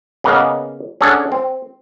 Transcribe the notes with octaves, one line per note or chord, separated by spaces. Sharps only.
C#3 A#3 B3 D#5 F5
C#4 D4 G#4 A4 F#5
C4